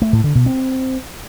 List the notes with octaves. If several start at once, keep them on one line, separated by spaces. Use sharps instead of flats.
A3
A2
D3
B2
C4